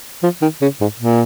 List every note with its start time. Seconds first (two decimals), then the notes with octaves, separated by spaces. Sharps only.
0.23 F3
0.42 D#3
0.62 C#3
0.81 G#2
1.00 A#2